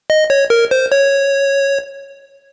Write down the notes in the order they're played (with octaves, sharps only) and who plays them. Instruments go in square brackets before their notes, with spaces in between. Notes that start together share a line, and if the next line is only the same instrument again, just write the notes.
[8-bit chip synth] D#5
C#5
A#4
C5
C#5